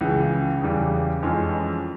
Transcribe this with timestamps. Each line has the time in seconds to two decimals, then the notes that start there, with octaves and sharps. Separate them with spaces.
0.01 C#2 C#3 E3
0.62 E2 C#3 E3 G3
1.23 F2 E3 G#3 C#4 F4